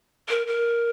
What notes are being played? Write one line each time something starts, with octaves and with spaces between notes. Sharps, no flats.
A#4
A#4